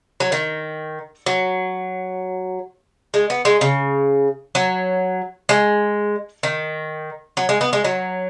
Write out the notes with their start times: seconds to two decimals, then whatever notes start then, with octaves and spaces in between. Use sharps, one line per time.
0.20 F#3
0.32 D#3
1.26 F#3
3.14 G#3
3.30 B3
3.45 G#3
3.61 C#3
4.55 F#3
5.49 G#3
6.43 D#3
7.37 F#3
7.49 G#3
7.61 B3
7.73 G#3
7.84 F#3